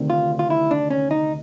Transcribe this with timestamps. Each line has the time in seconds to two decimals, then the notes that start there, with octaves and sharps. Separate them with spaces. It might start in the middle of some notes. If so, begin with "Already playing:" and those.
Already playing: D2 C3 D#3
0.10 F4
0.39 F4
0.50 E4
0.71 D4
0.90 C#4
1.11 D#4